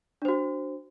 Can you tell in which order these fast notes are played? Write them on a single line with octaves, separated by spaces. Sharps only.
D4 C5 F#4